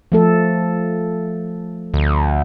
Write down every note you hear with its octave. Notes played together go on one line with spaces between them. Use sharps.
F3 A3 A4
D2